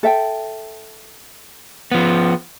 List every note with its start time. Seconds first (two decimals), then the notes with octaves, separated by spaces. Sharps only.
0.03 A4 E5 G5
1.91 F3 B3